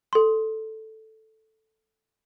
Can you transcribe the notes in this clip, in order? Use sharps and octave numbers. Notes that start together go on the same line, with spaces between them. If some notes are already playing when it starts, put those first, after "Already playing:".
A4 C6